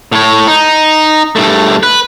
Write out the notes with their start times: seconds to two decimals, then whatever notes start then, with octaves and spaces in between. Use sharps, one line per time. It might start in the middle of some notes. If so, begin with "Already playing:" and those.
0.12 A2 C#5
0.48 D#4
1.36 G2 A3
1.83 B4